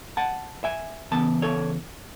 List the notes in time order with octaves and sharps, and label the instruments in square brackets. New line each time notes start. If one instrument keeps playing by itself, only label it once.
[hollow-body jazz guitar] F#5 A5
E5 G#5
C#3 E3 B3 A5
A4 C#5